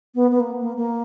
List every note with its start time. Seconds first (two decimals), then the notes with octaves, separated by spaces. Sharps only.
0.15 B3
0.31 B3
0.40 A#3
0.61 A#3
0.77 A#3